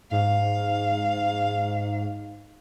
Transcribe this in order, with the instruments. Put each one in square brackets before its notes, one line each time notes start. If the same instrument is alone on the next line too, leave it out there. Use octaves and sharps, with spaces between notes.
[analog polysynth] G#2 [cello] F5